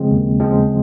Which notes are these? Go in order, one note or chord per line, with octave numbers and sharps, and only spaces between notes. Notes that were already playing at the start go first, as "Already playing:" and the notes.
Already playing: C#3 F3 G#3 C4
D#2
C#3 F3 G#3 C4